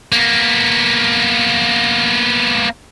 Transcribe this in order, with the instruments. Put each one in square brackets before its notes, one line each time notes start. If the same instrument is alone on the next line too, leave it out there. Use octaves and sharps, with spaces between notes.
[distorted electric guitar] A#3 B3